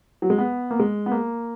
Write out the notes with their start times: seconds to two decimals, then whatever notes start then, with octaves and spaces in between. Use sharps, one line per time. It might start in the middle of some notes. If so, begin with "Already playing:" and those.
0.22 F#3
0.30 G#3
0.38 B3
0.71 A#3
0.79 G#3
1.06 B3
1.11 A#3